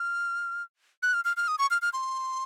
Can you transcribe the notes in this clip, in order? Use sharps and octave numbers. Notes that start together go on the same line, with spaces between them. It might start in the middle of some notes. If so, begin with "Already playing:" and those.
Already playing: F6
F#6
F6
F6
F6
D#6
C#6
F6
F6
C6